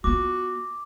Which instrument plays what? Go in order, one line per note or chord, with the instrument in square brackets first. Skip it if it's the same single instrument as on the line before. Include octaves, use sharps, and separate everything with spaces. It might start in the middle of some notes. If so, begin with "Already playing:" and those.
[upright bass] B3 F4 [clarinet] F#4 [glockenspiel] D6